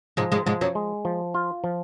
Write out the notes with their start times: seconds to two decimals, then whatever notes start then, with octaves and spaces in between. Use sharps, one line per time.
0.17 G#2 F3 G#3
0.32 G#2 G#3
0.46 G#2 F3 G#3
0.61 F#2 F#3
0.75 G#3
1.05 F3
1.34 F4
1.64 F3